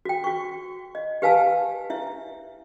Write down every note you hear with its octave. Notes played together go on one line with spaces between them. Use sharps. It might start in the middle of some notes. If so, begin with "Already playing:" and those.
F#4 G5
F#4 C#6
D#5
G4 B4 F5 G#5 A5 E6
E4 E5